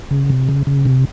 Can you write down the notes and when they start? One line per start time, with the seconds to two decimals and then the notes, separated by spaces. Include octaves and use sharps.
0.11 C#3
0.30 C3
0.49 C#3
0.67 C#3
0.85 C3